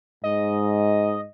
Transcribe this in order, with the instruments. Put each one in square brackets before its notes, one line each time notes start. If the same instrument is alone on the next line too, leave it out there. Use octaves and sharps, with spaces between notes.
[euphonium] G#2 [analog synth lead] D#5